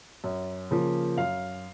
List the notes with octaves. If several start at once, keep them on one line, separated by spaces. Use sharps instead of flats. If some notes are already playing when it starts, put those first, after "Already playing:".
F#2
C#3 F3 A#3
F#2 F5